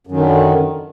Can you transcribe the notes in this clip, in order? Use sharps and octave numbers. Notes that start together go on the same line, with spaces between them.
F#2 D3 D#3